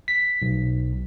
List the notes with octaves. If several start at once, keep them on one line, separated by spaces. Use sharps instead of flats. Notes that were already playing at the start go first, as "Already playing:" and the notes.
B6
B1